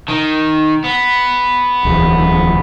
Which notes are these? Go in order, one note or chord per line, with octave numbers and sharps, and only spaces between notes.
D#3
B3
D1 E2